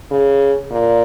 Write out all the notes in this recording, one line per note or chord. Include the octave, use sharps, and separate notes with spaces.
C#3
A#2